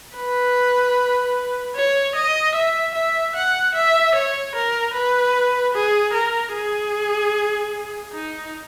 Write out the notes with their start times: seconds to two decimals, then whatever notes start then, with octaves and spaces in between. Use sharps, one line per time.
0.16 B4
1.75 C#5
2.16 D#5
2.55 E5
2.94 E5
3.35 F#5
3.75 E5
4.15 C#5
4.55 A#4
4.94 B4
5.74 G#4
6.14 A#4
6.54 G#4
8.12 D#4